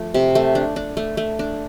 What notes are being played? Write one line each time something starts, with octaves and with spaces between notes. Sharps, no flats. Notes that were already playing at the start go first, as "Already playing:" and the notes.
Already playing: F3 A3
C3
A3
D4
D4
A3
A3
D4